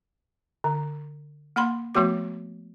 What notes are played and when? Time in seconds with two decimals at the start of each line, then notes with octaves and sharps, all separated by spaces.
0.64 D3
1.56 A#3 F#5 B5 C6
1.95 F3 A3 B3 F#4 D6